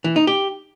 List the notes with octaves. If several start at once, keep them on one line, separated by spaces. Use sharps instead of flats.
E3
D#4
G4